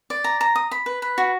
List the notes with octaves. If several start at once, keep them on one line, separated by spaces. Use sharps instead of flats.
D5
A#5
A#5
D#6
B5
B4
B4
F#4